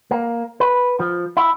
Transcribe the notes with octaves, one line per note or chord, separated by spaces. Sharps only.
A#3
B4
F3
E4